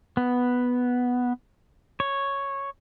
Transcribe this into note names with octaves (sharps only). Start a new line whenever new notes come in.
B3
C#5